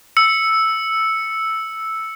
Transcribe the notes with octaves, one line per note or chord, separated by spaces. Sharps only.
E6 C#7